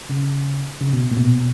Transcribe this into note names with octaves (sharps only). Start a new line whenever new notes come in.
C#3
C#3
B2
A#2
B2